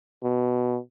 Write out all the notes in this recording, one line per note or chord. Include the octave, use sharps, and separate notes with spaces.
B2